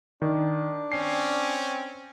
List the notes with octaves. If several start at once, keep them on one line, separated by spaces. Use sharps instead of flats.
D#3 D4
C4 C#4 C7